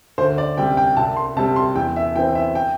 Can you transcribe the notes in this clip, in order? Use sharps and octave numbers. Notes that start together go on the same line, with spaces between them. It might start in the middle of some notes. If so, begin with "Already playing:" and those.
D2 C5
D5
C3 G3 G5
G5
C2 A5
C6
C3 G3 A5
C6
E2 G5
E5
E3 C4 G5
E5
G5